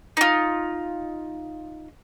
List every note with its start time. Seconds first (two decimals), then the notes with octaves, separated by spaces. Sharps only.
0.17 D#4 F4